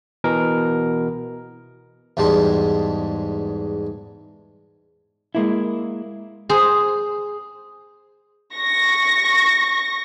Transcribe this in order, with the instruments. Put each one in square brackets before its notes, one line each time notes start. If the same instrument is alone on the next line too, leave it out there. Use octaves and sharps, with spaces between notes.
[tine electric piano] B2 E3 A#4
[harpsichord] E2 G#2 G3 G#3 A5 C6
[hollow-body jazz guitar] G#3 A#3 E4
[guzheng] G#4 C5
[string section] C#6 A#6